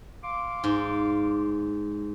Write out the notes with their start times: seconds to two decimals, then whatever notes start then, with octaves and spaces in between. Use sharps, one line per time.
0.23 F5 C6 D6
0.64 G#2